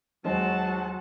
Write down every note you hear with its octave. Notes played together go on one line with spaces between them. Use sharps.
D#2 F#3 G#3 F#4 C5 F#5 A5